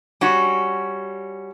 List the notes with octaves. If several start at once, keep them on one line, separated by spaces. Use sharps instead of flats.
G3 C#4 F#4